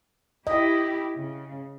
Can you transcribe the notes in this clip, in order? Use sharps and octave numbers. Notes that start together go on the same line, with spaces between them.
E4 G4 D#5
C#3